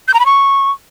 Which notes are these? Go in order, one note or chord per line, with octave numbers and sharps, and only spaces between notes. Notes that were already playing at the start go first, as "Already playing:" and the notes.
G6
A#5
B5
C#6